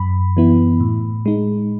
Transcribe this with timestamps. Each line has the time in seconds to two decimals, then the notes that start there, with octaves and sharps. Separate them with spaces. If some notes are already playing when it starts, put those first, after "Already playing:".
Already playing: F#2 B5
0.37 E3 B3 E4
0.80 A2
1.26 G#3 D#4